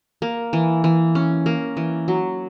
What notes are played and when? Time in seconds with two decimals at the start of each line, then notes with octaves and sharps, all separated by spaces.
0.22 A#3
0.53 E3
0.84 E3
1.15 C#4
1.46 A#3
1.77 E3
2.08 F#3